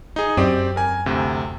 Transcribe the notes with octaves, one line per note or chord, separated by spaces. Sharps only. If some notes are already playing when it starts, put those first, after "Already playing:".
D#4 G#4
F#2 C4 G4 D5
A#4 G#5
D2 C3